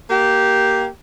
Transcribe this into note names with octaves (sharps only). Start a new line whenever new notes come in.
A#3 G4